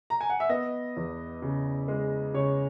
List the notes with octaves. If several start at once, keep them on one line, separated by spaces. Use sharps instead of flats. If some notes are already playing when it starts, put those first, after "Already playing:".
A#5
G#5
F#5
E5
B3 D#5
E2
C#3
G#3
C#3 C#5